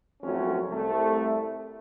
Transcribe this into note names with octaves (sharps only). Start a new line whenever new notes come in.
G#1 F2 F#3 A3 C#4
C2 A3